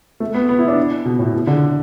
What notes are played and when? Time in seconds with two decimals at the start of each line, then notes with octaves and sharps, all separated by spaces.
0.20 A3
0.34 B3
0.49 B3
0.59 E4
0.68 D4
1.05 B2
1.19 A2
1.33 B2
1.47 D3